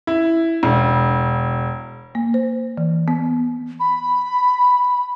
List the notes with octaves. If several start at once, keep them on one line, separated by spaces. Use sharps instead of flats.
E4
E1
A#3
C5
E3
B3
B5